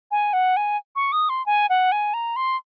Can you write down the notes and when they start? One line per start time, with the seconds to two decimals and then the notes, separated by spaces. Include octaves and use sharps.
0.11 G#5
0.33 F#5
0.57 G#5
0.96 C#6
1.12 D#6
1.29 C6
1.46 G#5
1.70 F#5
1.92 G#5
2.14 A#5
2.36 C6